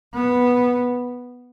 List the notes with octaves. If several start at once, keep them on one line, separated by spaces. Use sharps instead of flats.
B3